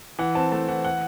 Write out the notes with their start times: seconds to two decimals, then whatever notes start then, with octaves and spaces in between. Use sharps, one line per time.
0.19 E3 F#5
0.35 C4 A5
0.52 A3 A5
0.68 E3 F#5
0.85 F#5